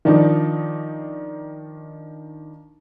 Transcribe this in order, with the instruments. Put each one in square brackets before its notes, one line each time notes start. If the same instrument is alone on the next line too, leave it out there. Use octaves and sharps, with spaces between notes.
[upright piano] D#3 F3 D4 D#4